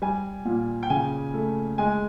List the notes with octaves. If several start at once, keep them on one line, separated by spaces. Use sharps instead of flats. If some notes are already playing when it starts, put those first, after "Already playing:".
G3 G#5
A#2
G5
C#3 G#5
A3
G#3 G#5